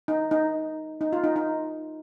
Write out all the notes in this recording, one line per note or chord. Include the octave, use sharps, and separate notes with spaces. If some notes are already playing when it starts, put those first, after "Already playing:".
D#4
D#4
D#4
F4
D#4
D#4